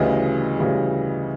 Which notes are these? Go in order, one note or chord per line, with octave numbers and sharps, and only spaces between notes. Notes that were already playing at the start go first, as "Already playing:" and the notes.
Already playing: D2 C#3 E3 G3 D#5
D2 C#3 E3 G3